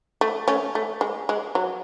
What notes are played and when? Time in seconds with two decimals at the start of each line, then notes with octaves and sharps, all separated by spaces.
0.21 A3
0.48 A3 C#4
0.75 A3
1.01 G#3
1.29 G#3
1.55 F#3